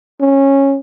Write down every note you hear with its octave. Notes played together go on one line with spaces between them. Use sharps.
C#4